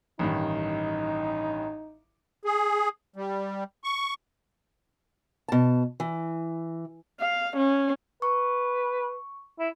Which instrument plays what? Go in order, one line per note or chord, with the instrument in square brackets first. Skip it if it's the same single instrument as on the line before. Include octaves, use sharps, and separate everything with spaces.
[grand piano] A1 G2 D#3 [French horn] D#4
[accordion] G#4
G3
C#6
[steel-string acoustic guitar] B2 A5
E3
[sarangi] F5
C#4
[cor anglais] B4 [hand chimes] C#6
[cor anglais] E4